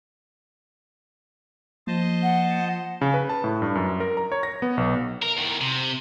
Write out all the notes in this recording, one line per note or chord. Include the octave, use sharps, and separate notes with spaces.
F3 A#3 C5 D#5 A5
F#5
C#3
B4
A5
A2
G2
F#2
A#4
A#5
C#5
A#6
B3
B1
A#4
E2 D#3
C3